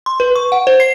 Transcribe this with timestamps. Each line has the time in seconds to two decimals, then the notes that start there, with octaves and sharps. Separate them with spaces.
0.06 C6
0.20 B4
0.36 C#6
0.52 F#5
0.67 C5
0.80 C7